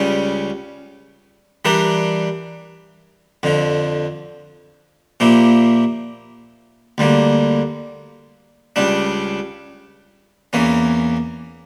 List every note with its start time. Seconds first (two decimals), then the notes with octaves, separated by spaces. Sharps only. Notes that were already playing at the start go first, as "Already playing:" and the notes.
Already playing: C#2 C#3 G3 C#4
1.65 E3 G3 D4 G4 A#4
3.43 F2 D3 F3
5.20 A#2 F3 A#3 E4 G4
6.98 D2 D3 G3 A#3
8.76 C#2 C#3 G3 D4
10.53 E2 E3 A#3 C#4